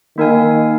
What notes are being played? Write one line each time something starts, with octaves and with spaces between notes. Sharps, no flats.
D#3 A#3 D#4 A#4 F5 G#5